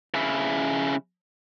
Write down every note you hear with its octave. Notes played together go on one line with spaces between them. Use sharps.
C#3 E4